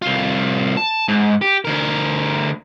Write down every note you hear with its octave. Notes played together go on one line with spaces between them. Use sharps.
C2 F4
A5
G#2
G4
D2 A#4